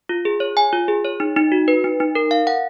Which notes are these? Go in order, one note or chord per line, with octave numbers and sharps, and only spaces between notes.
F4
G#4
C#5
G#5
F4
G#4
C#5
D#4
D#4
F#4
B4
D#4
D#4
A#4
F5
F#5